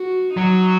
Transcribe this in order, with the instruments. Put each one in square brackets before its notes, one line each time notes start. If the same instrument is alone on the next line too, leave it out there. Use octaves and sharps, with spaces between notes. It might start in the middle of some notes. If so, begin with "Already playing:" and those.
Already playing: [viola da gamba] F#4
[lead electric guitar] F#3 [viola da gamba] D#4